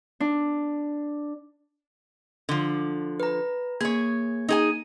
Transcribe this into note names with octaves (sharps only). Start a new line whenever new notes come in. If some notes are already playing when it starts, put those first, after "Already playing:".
D4
D3 F3
B4 A#5
A#3 G#4 C#5 G#6
D#4 G#4 G#5